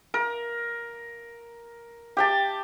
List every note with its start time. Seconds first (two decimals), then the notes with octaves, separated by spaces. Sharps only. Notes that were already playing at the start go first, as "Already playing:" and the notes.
0.14 A#4
2.17 G4 G5 A5